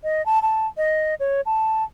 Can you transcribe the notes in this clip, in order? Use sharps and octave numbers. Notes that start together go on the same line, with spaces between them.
D#5
A5
A5
D#5
C#5
A5